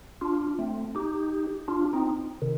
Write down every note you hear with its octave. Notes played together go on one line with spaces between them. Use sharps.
D4 F4
A3 C4
D#4 G4
D4 F4
C4 D#4
C3 D#3